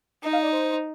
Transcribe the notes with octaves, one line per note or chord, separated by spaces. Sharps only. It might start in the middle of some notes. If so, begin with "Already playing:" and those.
D#4 D#5
F5
D5
C5